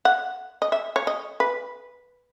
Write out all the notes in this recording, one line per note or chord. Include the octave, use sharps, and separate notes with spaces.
F#5
D#5
E5
C#5
D#5
B4